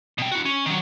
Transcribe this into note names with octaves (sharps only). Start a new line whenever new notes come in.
B2 G5
E4 F#4
C#4
D#3 F#3